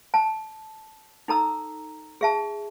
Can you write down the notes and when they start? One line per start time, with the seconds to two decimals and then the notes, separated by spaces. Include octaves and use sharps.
0.14 A5
1.28 D#4 A4 A#5 E6
2.21 G#4 E5 A5